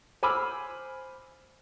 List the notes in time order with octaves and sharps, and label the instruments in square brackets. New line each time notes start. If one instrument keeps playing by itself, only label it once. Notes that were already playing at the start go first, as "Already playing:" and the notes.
[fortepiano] C5 G#5 B5 D6 E6 F6